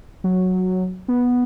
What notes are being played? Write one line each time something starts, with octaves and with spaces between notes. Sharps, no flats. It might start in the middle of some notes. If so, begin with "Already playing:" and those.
F#3
B3